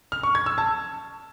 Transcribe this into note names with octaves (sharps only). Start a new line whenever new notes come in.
F6
C#6
G#6
E6
A5